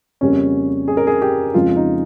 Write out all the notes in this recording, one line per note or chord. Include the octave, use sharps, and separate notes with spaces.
F2 C#3 G3 A#3 C#4
G#4
A#4
G#4
G4
F2 C#3 F3 G#3 F4
D#4